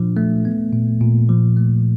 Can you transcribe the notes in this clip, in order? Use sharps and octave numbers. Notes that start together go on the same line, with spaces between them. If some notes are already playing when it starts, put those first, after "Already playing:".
Already playing: A#2 F3 D4
A3
B3
A#2
A#2
F3
A3